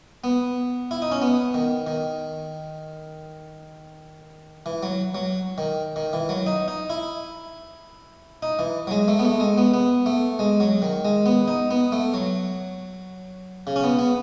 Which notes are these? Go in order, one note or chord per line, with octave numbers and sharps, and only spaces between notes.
B3
E4
D#4
C#4
B3
D#3
D#3
E3
F#3
F#3
D#3
D#3
E3
F#3
D#4
D#4
E4
D#4
E3
F#3
G#3
A3
B3
A3
G#3
B3
B3
A3
G#3
F#3
D#3
G#3
B3
D#4
B3
A3
F#3
C#3
C#4
B3
B3